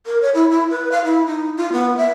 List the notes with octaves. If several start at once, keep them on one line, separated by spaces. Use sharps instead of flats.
A#4
C#5
E4
E4
B4
F5
E4
D#4
F4
B3
E5